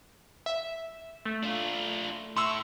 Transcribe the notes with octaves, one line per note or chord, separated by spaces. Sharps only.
E5
A3
D4 F4
E4 A4 C6 C#6 E6